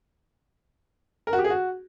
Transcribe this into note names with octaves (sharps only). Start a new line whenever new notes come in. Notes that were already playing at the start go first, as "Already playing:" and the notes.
A#4
F#4
G4
G#4
F#4